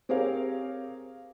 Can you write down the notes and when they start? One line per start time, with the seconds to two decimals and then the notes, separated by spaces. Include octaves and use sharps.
0.09 C4 G4 G#4 A#4 C#5 F5